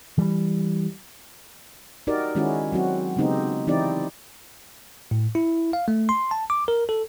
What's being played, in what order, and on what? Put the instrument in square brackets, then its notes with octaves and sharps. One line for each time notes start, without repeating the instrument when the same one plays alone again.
[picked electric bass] E3 G3
[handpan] D#4 F#4 G4 A#4 D5
D#3 G#3 C#4 E4 F#4
F#3 C4 F#4
C#3 G#3 B3 C4 D#4 G4
E3 C4 D#4 E4 G4 D5
[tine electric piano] A2
E4
F5
A3
C6
A5
D6
A#4
A4